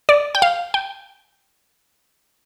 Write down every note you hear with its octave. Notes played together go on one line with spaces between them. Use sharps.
D5
G5
F5
G5